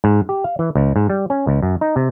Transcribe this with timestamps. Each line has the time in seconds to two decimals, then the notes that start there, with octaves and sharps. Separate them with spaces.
0.04 G#2
0.29 G4
0.44 F5
0.59 E3
0.75 C#2
0.96 G#2
1.10 G3
1.30 C#4
1.47 C#2
1.62 F#2
1.81 D#4
1.96 C3